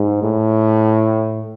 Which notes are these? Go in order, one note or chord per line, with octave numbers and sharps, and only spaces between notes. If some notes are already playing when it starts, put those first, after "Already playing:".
Already playing: G#2
A2